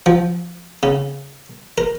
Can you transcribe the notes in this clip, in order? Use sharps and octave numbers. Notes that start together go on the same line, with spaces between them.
F3
C#3
A#4